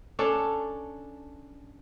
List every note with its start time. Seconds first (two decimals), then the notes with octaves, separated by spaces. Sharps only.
0.19 C#4 D4 A4